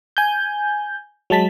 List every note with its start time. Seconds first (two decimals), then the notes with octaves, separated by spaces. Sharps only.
0.17 G#5 G6
1.30 F#3 G#3 A5 B6